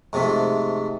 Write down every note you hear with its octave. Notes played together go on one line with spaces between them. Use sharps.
G#2 C3 F3 A3